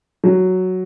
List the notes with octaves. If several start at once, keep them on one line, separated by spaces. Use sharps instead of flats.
F#3